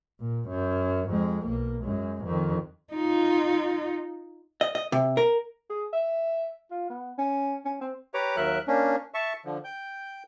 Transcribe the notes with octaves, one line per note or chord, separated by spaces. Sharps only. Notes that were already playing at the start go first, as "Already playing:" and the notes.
A#2
F#2
F2 G#3
B1 A#3
F#2 G#3
F2 D#3
D#4 F4
D#5
D#5
C3
A#4
G#4
E5
F4
B3
C#4
C#4
C4
G4 B4 C#5 A#5 D6
D#2 F#3 A#4 E5 F#6
A#3 C#4 D4
E5 A5 C#6
D3 F3
G5 G6